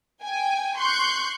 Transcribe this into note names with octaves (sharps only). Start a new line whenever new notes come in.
G5 G#5
C6 C#6 F#6 G6